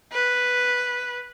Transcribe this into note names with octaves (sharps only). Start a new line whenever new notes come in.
B4